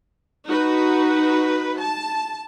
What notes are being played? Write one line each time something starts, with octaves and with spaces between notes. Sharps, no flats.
D#4 F#4 B4
A5